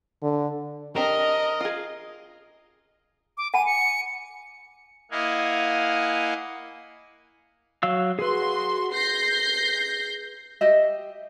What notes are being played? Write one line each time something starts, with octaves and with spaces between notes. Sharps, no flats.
D3
C4 D4 G4 A#4 D#5
F4 G#4
D6
F#5 G#5 B5 D#7
C#7
A#3 E4 D#5 F5 F#5 G#5
F#3 F5 E6
F#4 G#4 B4 C6
G6 A#6 C7
G4 D#5 E5